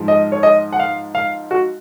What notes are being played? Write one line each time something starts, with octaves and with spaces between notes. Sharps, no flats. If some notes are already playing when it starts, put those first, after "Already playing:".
Already playing: G#2 F3 G#3
D#5
C#5
D#5
F#5
F5
F5
F#4